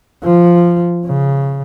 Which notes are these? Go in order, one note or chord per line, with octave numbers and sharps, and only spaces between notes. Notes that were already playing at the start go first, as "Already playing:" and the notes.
F3
C#3